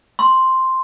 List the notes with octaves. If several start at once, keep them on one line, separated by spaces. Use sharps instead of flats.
C6